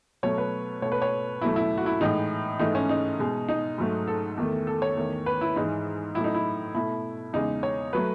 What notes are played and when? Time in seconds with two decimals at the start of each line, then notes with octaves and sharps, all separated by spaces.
0.23 B2 F#3 A3 C#5
0.38 B4
0.82 B2 A3 C#5
0.92 B4
1.02 C#5
1.41 E2 B2 F#3 A3 E4
1.56 E4
1.78 F#4
1.86 E4
2.01 A2 E3 G#3 D#4
2.59 G#2 E3 A3 D#4
2.75 C#4
2.89 D#4
3.19 B2 G#3
3.49 D#4
3.78 G#2 F#3 A3
4.08 A4
4.37 E2 D#3 A3
4.67 A4
4.82 C#5
4.97 E2 D#3 A3
5.26 B4
5.41 E4
5.56 G#2 E3 G#3 D#4
6.15 A2 F#3 A3 E4
6.24 D#4
6.34 E4
6.74 B2 A3 E4
7.33 E2 C#3 G#3 D#4
7.63 C#5
7.93 F#3 A3 B4